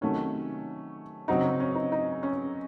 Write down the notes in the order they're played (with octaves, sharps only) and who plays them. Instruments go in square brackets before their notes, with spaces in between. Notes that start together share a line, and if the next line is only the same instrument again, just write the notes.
[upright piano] C3 D#3 F#3 A3 [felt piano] C#4
[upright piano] C#3 F#3 C4 F#4 [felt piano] D#4
[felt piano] C#4
C#4
D#4
D#4
C#4